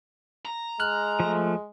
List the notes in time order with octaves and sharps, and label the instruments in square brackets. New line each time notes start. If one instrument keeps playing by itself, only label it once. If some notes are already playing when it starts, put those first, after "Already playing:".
[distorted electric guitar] A#5
[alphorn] G#3 [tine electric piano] F6 F#6
[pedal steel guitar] F3 A3